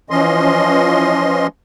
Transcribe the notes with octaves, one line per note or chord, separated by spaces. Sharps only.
E3 F3 C#4 D#5 C6